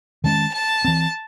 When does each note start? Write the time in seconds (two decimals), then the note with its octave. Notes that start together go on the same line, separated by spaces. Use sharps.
0.24 D#3 G#3 C#4 A5
0.54 A5
0.84 E3 C4